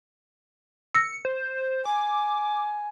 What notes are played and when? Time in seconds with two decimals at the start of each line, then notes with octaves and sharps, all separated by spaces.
0.94 E6 A#6 C#7
1.25 C5
1.85 G#5 D6